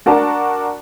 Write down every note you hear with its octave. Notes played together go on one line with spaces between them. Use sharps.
D4 F#4 A#4 A5